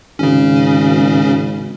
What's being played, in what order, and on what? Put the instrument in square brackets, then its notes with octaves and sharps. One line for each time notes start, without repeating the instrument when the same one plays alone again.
[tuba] G#1 [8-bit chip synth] C#3 C#4